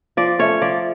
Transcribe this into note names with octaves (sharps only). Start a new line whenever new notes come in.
F3 D5
A3 C#4 C#5
F3 D5